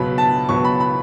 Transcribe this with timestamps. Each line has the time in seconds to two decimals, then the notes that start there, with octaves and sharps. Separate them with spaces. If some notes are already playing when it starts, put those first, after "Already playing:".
Already playing: C#2 B2 F#3 B3 B5
0.18 A5
0.49 C#2 B2 F#3 B3 C#6
0.64 B5
0.80 B5